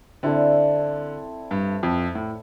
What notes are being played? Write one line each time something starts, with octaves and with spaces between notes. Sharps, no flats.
D3 C4 E4 A4 D5
G2
F2
A2